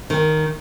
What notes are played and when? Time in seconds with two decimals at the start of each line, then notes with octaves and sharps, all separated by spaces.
0.10 D#3